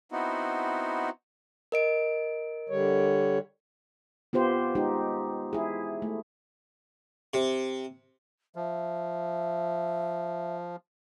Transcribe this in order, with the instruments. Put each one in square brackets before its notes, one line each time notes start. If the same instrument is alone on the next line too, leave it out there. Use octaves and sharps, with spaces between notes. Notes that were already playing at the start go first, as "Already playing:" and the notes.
[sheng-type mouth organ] B3 C4 D#4 E4 F#4
[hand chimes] A#4 D#5 D7
[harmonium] D3 G3 C#5
[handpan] B3 F4 G4 C5
G#3 D#4 F4 G4
E4 G#4
A3
[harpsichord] C3
[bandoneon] F3 [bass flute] E5